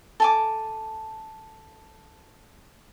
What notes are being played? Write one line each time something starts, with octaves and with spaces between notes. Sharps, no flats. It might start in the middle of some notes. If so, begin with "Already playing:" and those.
A4 G#5 D6